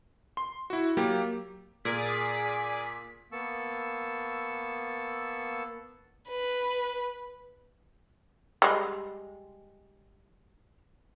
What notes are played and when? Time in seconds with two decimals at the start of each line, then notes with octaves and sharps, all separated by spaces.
0.37 C6
0.70 E4 F#4
0.97 F#3 A#3 G4
1.85 A#2 G#4 A#4 D5 B6
3.32 A#3 B3 A5 C#6 E6
6.29 B4
8.62 G3 G#3